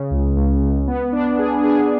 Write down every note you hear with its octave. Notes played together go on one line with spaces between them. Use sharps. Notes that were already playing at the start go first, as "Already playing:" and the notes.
Already playing: C#3
C#2
C#2
C#2
B3
D4
G#4
G#4